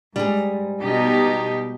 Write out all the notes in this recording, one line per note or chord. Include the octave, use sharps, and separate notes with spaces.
G#2 G3 G#4
B2 D#4 G4